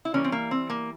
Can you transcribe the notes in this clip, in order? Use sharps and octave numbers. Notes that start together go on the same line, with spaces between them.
E4
E3 G3 A#3 C#4
C4
A#3
C4
A#3